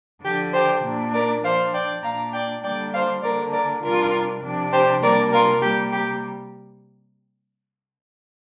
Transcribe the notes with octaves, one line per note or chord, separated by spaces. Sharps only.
D3 F3 D4 G4
G4 C5
A#2 A#3 D4
A#4 D5
F3 D4 C5 F5
D5 G5
A#2 A#3 D4 F5 A#5
D5 G5
D3 G3 A#3 D4 D5 G5
C5 F5
D3 A#3 D4 A#4 D5
A#4 D5
C3 G3 D4 F4 A#4
C3 F3 D4
G4 C5
C3 G3 A#3 D4 A#4 D5
F4 A#4
C3 G3 A#3 G4
G4